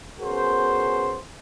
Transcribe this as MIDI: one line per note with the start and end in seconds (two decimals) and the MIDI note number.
0.20 1.17 59
0.20 1.17 61
0.20 1.17 66
0.20 1.17 68
0.20 1.17 70
0.20 1.17 72